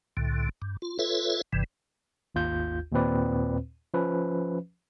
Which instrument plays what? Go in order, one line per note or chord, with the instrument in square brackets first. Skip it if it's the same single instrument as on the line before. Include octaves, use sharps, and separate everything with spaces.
[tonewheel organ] C2 A2 D3
G2
F4
F4 A4 B4 C#5 E5
G1 G2 C3 E3
[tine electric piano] G#1 D#2 F4 G6
D#2 A#2 C4 B4 D5
F3 C#4 B4